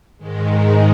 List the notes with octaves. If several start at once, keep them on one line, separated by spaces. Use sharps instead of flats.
G#2 D#3 G#3